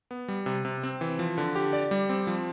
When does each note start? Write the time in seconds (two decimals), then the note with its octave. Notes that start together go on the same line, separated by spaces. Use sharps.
0.11 B3
0.28 G3
0.46 C3
0.65 C3
0.83 C4
1.01 E3
1.19 F3
1.38 D3
1.56 G4
1.73 D5
1.91 G3
2.09 C4
2.27 F3